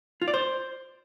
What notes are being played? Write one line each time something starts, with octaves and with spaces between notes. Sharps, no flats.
F4
D5
C5